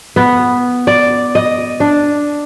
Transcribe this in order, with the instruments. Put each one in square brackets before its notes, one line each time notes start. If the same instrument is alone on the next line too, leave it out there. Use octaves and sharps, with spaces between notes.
[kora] B3
D5
D#5
D4